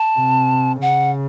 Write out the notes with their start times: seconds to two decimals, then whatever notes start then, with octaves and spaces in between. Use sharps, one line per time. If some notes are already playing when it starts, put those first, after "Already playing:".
Already playing: A5
0.17 C3
0.81 C#3 F#5